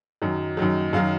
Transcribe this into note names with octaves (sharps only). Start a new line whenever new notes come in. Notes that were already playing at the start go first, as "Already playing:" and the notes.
F#2 D#3 F#3
F#2 D#3 F#3
F#2 D#3 F#3 F5